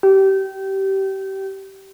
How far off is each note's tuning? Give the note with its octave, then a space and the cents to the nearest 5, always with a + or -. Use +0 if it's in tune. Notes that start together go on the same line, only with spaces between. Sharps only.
G4 -25